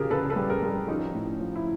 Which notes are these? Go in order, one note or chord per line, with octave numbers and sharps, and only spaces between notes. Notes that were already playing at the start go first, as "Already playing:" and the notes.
Already playing: C#3 F4 G4 G#4 A#4
C#3 A4 B4
A4 B4
G3
G#4 A#4
G3
G4 A4
F3 C#4 D#4
A2
F3
E4